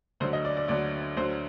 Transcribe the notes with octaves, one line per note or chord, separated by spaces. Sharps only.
D2 D3 F#3 C5
D#5
D5
D5
D2 D3 F#3 D5
D2 D3 F#3 C5